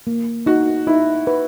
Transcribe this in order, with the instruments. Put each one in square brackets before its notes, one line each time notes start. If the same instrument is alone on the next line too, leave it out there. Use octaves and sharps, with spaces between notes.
[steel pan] A#3
[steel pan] D#4 [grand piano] F#4
[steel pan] D#4 [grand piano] E4
[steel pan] B4